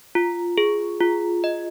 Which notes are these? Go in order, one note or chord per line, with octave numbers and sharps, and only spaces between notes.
F4
G#4
F4
D#5